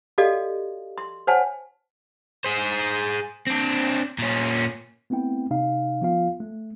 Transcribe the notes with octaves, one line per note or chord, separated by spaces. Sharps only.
F#4 G4 A4 D5 D#5 F5
C6
C5 C#5 F#5 G#5 A5
G#4 C5
C4 D4
A#2 C#4
A3 B3 C4 E4 G5
C3 D#4 F5
F3 B3 F4 F5
A3